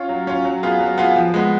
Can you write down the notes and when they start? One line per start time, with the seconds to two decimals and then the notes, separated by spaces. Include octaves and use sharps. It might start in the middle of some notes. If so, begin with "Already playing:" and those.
Already playing: C#4 F4
0.09 F#3
0.27 C#4 F4
0.45 F#3
0.63 B3 F4 G#4
0.80 F#3
0.98 B3 F4 G#4
1.16 F3
1.34 G#3 B3